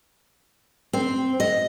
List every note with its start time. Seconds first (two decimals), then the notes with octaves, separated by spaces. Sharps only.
0.93 C4
1.40 D#5